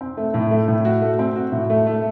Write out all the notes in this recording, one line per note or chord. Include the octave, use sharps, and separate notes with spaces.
C4
A3
A2
A3
A2
F#4
A3
C4
F#4
A2
A3
A3